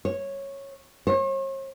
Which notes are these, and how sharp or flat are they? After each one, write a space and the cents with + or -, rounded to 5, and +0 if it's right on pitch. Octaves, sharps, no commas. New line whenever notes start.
C#5 -10
C#5 -45